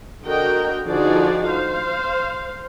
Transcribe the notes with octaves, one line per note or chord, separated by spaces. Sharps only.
D3 F#4 A#4 D#5 G5
D3 F3 D#4 F#4 G#4 D5
C5 F5